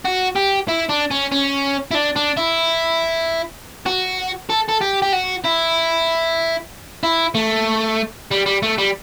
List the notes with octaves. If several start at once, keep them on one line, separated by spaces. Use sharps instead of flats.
F#4
G4
E4
D4
C#4
C#4
E4
D4
D4
E4
F#4
A4
A4
G4
G4
F#4
E4
E4
A3
G3
G3
A3
G3